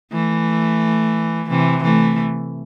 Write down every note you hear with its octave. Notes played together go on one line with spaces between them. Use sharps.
E3 A3
C3 E3
E3 A3